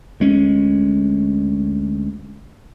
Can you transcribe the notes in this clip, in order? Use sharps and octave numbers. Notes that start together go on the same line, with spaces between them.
D2 G#3 C#4